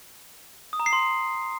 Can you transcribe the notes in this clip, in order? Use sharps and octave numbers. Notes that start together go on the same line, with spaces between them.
D#6
A#5
C7
C6
C7